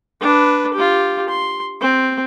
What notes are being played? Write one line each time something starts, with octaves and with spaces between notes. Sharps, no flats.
D4 B4
F4 G4
C6
C4